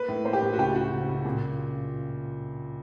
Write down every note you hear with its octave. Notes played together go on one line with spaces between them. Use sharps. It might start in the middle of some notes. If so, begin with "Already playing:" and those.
Already playing: A#3 B4
A2
A#3 C5
G4
A2
F#4
C#2 G4
C#3 F#4
C#2
C#2
A#2